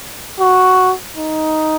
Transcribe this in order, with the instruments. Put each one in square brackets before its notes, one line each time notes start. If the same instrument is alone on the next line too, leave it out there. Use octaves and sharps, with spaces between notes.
[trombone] F#4
D#4